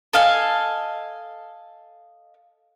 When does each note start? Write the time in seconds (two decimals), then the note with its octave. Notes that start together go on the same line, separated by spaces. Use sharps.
0.13 A4 D#5 F5 G#5